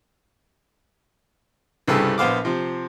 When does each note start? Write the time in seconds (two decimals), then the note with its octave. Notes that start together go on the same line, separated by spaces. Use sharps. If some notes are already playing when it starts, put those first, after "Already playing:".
1.88 C2 G2 C#3 G4 A4 E6
2.18 A#1 B3 C5 F5 D6
2.45 C3 F3